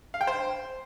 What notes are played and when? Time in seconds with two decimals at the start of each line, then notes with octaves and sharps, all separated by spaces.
0.14 F5
0.21 G5
0.27 C5